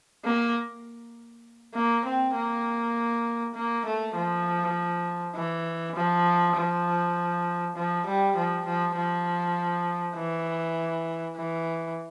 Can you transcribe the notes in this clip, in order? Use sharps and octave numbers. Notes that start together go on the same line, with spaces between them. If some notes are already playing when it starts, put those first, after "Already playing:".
A#3
A#3
C4
A#3
A#3
A3
F3
E3
F3
F3
F3
G3
F3
F3
F3
E3
E3